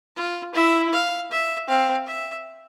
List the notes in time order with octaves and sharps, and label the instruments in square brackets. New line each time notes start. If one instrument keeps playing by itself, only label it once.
[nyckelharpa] F4
[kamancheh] E4 [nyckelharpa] E5
[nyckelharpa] F5
E5
[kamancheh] C4 [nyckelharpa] F5
[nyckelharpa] E5